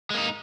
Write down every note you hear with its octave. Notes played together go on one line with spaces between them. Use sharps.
G#3 A#3 D#4